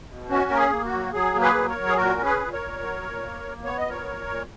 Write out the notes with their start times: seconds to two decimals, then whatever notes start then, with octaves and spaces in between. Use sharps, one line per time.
0.08 B2
0.29 C#4 F#4
0.50 A#3 A#4
0.57 G#4
0.71 A#3
0.85 F#4
0.92 F#3
1.13 F#3 G#4
1.34 A#3
1.41 G#4 B4
1.55 F#3
1.69 A#4 C#5
1.76 F#3
1.88 G#4
1.97 A#2 F#4 A#4
2.18 C#4
2.24 G#4 B4
2.39 A#2
2.53 A#4 C#5
2.59 A#2
2.81 F#3
3.01 A#2
3.22 A#3
3.44 A#3
3.64 B3 C#5
3.78 D#5
3.86 A#2 A#4 C#5
4.06 A#2
4.28 A#2